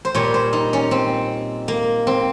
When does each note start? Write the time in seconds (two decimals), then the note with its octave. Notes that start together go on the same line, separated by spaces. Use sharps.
0.05 C5
0.15 A#2 G3 C#5
0.34 C5
0.53 D#4
0.73 C#4
0.91 C4
1.68 A#3
2.07 C4